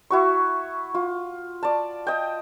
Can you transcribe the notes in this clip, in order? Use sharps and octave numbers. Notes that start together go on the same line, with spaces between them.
E4 F#4 C#6
F4
D5 A5
D#5 G5